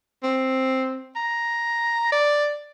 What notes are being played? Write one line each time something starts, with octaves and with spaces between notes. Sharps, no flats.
C4
A#5
D5